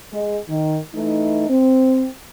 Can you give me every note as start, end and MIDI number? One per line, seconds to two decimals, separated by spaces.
0.13 0.37 56
0.49 0.77 51
0.95 1.49 52
0.95 1.49 57
0.95 1.49 63
1.49 2.07 60